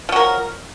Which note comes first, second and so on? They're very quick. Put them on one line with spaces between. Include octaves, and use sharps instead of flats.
F3 F#3 A#4